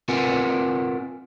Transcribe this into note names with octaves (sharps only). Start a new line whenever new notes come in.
C4 F4 A#4 B4 F#5 G#5